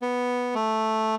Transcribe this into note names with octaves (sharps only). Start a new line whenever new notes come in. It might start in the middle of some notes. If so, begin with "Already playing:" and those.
B3
A3